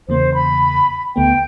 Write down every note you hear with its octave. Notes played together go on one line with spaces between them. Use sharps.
E2 C#3 A#3 C5
B5
D2 A3 B3 G5